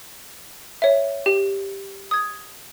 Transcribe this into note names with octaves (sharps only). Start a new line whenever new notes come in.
C#5 E5
G4
D#6 G#6